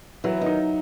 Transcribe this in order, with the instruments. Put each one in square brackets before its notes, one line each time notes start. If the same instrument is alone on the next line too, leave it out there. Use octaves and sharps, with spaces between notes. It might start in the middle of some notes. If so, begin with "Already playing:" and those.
[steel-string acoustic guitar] E3 [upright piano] F#3
[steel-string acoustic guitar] D#3 [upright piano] D#4